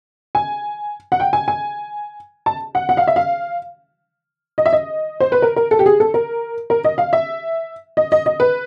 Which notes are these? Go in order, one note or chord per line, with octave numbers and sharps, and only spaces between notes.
G#5
F#5
G5
G#5
G#5
A5
F#5
F#5
F5
E5
F5
D#5
E5
D#5
C5
B4
A#4
A#4
A4
G4
G#4
A4
A#4
A#4
D#5
F5
E5
D#5
D#5
D#5
B4